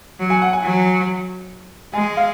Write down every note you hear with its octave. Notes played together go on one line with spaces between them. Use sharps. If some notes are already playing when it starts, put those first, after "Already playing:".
F#3
G#5
F#5
G#5
F#3
G#3 G#5
F5